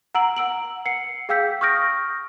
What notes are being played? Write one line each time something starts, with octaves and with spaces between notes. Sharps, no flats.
F#5 A#5 E6 D7 F#7
F#5 E6 D7 F#7
F#5 C7 C#7
G#4 F5 G5 E6 G6 B6
C#6 D#6 F6 G6 A#6 D7